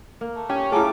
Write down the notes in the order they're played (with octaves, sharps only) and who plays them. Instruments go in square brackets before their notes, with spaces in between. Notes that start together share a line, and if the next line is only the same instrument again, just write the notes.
[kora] A#3
[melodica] A3
[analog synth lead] C#4 [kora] G4 [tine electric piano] G5
[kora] A2 F4 [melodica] A3 D6 [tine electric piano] G#4 G#5 A#5